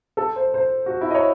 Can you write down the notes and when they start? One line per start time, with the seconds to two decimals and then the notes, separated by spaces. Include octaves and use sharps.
0.17 A4
0.36 C5
0.54 C5
0.86 F#4
1.01 E4
1.10 D#5
1.14 C#5